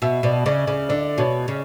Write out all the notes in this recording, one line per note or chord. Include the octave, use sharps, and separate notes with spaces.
B2 E5
B2 D5
C#3 D5
C#3 D5
D3 D5
B2 C#5
C#3